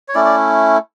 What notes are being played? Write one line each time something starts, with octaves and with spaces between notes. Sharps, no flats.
C#5
A3 C#4 E4 D5
D5